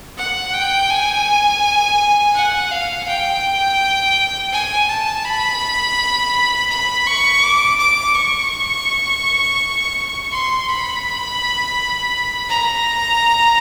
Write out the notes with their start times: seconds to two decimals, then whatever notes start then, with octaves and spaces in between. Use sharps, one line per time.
0.18 F#5
0.53 G5
0.89 G#5
2.35 F#5
2.71 F5
3.08 G5
4.52 G#5
4.89 A5
5.25 B5
6.70 B5
7.07 C#6
7.43 D6
7.78 D6
8.15 C#6
10.32 C6
10.69 B5
12.49 A#5